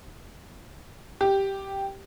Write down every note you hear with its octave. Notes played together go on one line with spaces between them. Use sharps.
G4